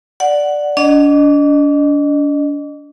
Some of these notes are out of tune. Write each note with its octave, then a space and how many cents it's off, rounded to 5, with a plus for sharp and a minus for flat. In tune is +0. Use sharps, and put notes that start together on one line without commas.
D5 +0 F#5 +0
D4 -35 D#5 -25